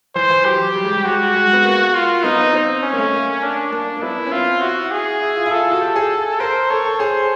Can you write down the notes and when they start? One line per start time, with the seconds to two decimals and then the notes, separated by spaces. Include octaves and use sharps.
0.15 E3 C5
0.30 E3
0.45 F#3 G4
0.75 G3
0.84 G#3
0.94 G3
1.05 G#3 F#4
1.35 G#3
1.53 B3
1.64 A#3
1.94 F4
2.24 B3 D#4
2.39 C4
2.53 C4
2.83 C#4
2.93 A#3
2.98 A3
3.13 A#3
3.43 D4
3.72 A#3 D4
3.96 A#3
4.02 B3 E4
4.26 C#4
4.32 C4 F4
4.62 E4 F#4
4.92 G#4
5.21 E4
5.36 F4
5.46 E4
5.51 F4 A4
5.72 F#4
5.81 G4
5.96 G#4
6.40 A#4 C5
6.70 A4 C#5
6.85 A4
7.00 G#4 C5